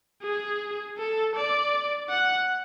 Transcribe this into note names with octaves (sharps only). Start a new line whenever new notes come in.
G#4
A4
D5
F#5